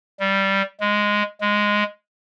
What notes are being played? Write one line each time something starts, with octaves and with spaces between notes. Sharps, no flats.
G3
G#3
G#3